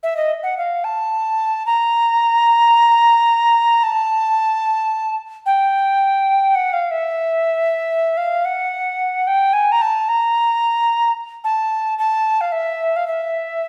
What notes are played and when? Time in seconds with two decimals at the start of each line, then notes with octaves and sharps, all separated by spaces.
0.03 E5
0.17 D#5
0.43 F#5
0.58 F5
0.84 A5
1.66 A#5
3.83 A5
5.46 G5
6.55 F#5
6.73 F5
6.91 E5
8.17 F5
8.45 F#5
9.27 G5
9.53 G#5
9.72 A#5
9.82 A5
10.09 A#5
11.44 A5
11.98 A5
12.41 F5
12.52 E5
12.96 F5
13.07 E5